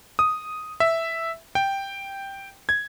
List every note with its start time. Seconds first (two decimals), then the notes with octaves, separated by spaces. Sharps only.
0.19 D#6
0.80 E5
1.55 G5
2.69 G#6